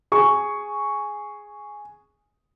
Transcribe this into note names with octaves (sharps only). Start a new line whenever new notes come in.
G#4 C#6